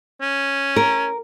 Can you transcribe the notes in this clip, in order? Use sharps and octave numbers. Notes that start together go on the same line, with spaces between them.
C#4
A#4